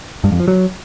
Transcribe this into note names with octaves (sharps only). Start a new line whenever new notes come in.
G2
F2
F3
F#3